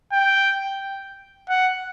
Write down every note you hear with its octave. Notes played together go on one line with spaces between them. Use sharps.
G5
F#5